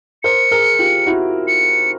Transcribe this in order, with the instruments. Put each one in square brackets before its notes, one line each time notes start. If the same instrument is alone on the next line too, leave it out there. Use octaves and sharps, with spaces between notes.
[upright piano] A#4 C5 [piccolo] C#7
[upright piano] G#4 A#4
F4 G4
E4 F#4
[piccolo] C#7